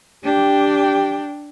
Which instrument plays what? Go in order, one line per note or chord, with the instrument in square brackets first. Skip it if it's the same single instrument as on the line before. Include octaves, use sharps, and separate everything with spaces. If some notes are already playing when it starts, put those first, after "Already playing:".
[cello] D4 G5 [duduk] G4